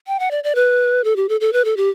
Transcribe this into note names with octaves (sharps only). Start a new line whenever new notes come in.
G5
F#5
D5
D5
B4
A4
G4
A4
A4
B4
A4
G4